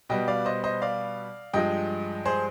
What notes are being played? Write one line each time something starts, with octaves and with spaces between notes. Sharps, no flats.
B2 G3 B3 D#5 G5
D5 F5
C5 D#5
C5 D#5
D5 F5
G2 F3 G#3 D#5 G5
G#4 C5